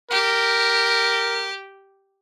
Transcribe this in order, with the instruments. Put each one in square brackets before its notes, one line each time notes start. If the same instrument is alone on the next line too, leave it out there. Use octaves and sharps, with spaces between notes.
[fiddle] G4 [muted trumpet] A#4